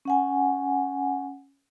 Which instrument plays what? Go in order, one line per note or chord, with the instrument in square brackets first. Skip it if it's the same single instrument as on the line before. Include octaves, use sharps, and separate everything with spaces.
[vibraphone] C#4 F#5 G#5